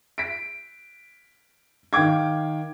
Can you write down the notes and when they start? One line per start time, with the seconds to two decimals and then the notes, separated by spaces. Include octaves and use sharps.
0.18 B6 D7
1.93 D#3 F5 G5 D6 G#6